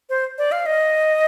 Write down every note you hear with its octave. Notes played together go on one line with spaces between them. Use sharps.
C5
D5
F5
D#5